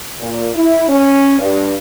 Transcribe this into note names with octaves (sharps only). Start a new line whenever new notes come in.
A#2
E4
C#4
G2